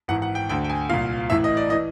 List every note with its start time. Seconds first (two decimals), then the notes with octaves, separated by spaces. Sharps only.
0.08 G#1 G#2 E3 F#5
0.22 F#5
0.35 G5
0.49 D2 D3 G5
0.64 G5
0.70 G#5
0.89 C2 A#2 F5
1.30 A1 A2 E3 E5
1.44 D#5
1.57 D5
1.70 E3 D#5